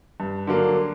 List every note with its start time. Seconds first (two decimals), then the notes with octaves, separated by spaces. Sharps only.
0.20 G2
0.47 D3 F#3 A#3